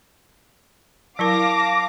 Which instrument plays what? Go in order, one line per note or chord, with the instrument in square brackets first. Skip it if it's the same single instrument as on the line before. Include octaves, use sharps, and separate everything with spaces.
[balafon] F#3 E4 A#4 [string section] F5 D6 A#6 [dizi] A5